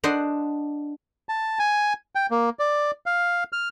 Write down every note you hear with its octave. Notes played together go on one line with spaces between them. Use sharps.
D4 C5 D#5 F#5
A5
G#5
G5
A#3
D5
F5
F6